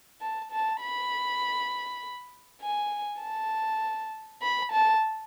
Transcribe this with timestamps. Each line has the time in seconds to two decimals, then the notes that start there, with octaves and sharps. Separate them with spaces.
0.21 A5
0.52 A5
0.81 B5
2.61 G#5
3.22 A5
4.42 B5
4.72 A5